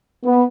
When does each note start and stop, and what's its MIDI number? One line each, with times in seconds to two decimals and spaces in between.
0.25 0.44 59